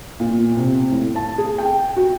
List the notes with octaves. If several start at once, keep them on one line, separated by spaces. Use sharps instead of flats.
A#2
C3
A2
A5
G#4
G5
F#4